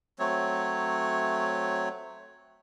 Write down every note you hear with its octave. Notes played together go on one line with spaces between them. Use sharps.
F#3 A3 C4 C#5